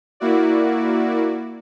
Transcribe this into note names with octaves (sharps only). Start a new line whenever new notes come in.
A#3 E4 F#4 D5